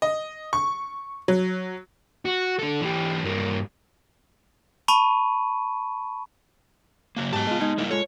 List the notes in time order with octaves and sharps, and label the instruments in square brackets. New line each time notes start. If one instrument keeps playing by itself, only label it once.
[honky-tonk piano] D#5
C#6
F#3
[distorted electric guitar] F#4
D4 A4
E3 G4
G2 A#3
[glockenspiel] A5 B5 C#6 D#7
[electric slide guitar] C#3 F#3 A#3
[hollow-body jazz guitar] G#2 F#3 G4 [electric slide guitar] B3 A5
[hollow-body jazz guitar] G#3 F4
G#3 D#4 G#5
[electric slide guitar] G3 A#3 E4
[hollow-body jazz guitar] G#3 F4 A4 [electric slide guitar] C#5